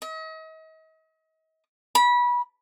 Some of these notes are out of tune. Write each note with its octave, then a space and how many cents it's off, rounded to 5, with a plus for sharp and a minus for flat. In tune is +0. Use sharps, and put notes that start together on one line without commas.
D#5 +40
B5 -25